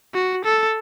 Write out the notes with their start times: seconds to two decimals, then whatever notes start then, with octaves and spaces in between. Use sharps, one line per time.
0.14 F#4
0.45 A4